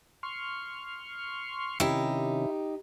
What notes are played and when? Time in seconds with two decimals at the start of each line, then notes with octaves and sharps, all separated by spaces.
0.23 C6 C#6 F6
1.80 C3 D#3 C#4 D#4 E4 G4